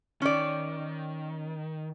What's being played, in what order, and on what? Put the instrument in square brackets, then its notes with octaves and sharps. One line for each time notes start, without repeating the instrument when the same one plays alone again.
[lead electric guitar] D#3 [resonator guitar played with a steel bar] C#4 D5